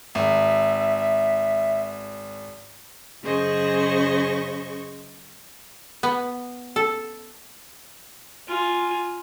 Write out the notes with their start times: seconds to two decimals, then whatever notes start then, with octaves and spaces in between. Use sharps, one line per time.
0.15 G#1 E5
3.23 F#2 C#3 G#4 C5 D#5 C#6
6.03 B3
6.76 A4
8.47 F4 G#5